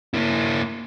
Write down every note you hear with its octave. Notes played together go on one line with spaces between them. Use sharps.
A#3 E4